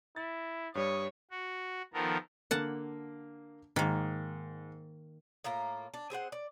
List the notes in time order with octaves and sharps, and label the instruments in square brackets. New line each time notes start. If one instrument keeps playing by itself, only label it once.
[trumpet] E4 [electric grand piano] A6
[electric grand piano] G2 G3 [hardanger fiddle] C#5 [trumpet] D#6
[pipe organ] F#4
D#3 F3 B3 A4 A#4
[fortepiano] D3 A#3 [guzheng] F#5 A5
[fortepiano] G#2 [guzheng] D#3 A#3
[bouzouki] A2 A#3 F4 A#5
D4
C4 G#4 C5 F#5
D5